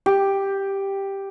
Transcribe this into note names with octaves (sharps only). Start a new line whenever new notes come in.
G4